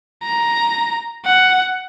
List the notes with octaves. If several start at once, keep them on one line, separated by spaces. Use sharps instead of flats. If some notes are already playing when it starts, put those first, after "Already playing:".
A#5
F#5